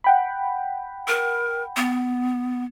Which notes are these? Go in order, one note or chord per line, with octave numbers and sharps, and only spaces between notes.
F#5 G5 B5
A#4
B3